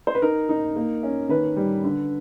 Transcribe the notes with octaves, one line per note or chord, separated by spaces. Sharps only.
C5
B4
D#4 A#4
D#4
A#3
C#4
D#3 B4
G3
D3